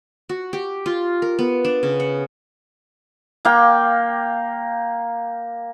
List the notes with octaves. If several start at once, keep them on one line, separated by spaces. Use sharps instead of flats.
F#4
G4
F4
A#4
B3
D4
C#3
F#5
A#3 F5 G5